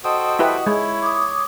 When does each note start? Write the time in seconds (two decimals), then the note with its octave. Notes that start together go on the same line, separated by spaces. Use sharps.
0.04 F#4 A4 C5 D#5 G5 D#6
0.39 E4 G4 B4
0.66 G#3 E4 C#5
1.02 D6 D#6